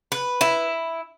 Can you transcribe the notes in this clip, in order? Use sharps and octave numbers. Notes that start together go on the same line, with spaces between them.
B4
E4